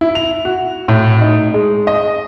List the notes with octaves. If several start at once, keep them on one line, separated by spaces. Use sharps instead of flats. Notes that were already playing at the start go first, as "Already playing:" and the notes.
E4
F7
F#4
A2
D#4
G#3
D#5